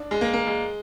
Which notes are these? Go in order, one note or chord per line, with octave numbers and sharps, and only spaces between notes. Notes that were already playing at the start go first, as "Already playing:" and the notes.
Already playing: D4
G#3
A#3
A#3
G#3